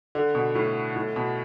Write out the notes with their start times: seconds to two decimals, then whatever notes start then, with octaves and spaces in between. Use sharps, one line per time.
0.15 D3
0.35 B2
0.55 A2
0.96 A2
1.16 B2